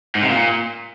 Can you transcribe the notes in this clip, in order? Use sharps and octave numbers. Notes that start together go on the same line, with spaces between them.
G#2
C3
A#2